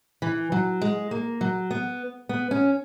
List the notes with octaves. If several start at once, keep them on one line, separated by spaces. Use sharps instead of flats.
E3
F#3
G#3
A#3
F#3
B3
B3
C#4